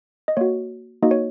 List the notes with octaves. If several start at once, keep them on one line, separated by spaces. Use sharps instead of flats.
D#5
A#3 F#4 C#5
A#3 D#4 F#4 D#5
C#5